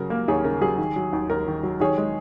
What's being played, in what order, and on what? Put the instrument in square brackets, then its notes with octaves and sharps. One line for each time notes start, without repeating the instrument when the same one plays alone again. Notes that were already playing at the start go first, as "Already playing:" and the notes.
Already playing: [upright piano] C#3 F#3 A#4
A#3
D#2 G#4 C#5
C#3 A#4
F#3 G#4
D#3
F#3
D#2
D#2 A#4
D#3
F#3
D#3 G#4 C#5
G#3